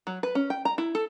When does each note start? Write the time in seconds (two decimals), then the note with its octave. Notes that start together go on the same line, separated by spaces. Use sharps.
0.07 F#3
0.23 B4
0.35 C#4
0.50 G5
0.65 A#5
0.78 E4
0.95 A4